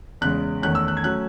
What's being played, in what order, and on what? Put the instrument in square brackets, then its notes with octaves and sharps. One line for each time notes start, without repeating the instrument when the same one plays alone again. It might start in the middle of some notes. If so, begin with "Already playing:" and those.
[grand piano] E2 C#3 G#3 F#6
E2 D#3 A3 C#4 F#6
E6
F#6
G#6
F#3 A3 C#4 F#6